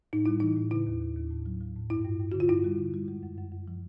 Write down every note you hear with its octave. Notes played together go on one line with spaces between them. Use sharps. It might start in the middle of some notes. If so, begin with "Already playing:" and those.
A2 D#4
G3 E4
E3 D#4
A2
C#3 E4
D#2
D#2
D#2
A2
F#3
F#3
A2
G2 E4
G2
G2
D3 F#4
F4
G2 E4
G3
D3
G3
G#3
F#2
F#2
F#2
F3